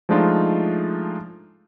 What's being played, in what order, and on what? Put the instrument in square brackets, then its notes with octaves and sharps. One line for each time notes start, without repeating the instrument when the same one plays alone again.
[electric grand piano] F3 G#3 A3 D4 D#4 F4